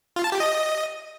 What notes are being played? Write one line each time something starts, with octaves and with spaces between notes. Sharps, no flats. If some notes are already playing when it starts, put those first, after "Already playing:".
F4
A5
G4
D#5